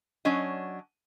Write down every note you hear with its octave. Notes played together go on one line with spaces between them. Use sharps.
F#3 C#4 D4 D#5